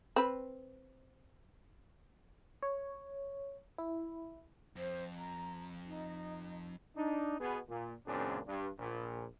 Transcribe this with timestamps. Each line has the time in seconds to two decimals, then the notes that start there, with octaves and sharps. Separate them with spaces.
0.16 C4 B4
2.63 C#5
3.78 E4
4.76 F2 C5
5.16 A#5
5.85 D#4
6.96 D4 D#4
7.40 B2 B3 G#4
7.69 A#2
8.07 C#2 F#2 A#2 C4 D4 G#4
8.47 G2
8.79 A#1 A#2